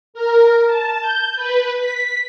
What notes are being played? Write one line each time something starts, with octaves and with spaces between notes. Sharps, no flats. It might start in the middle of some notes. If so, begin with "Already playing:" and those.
A#4
A5
G6
B4
B6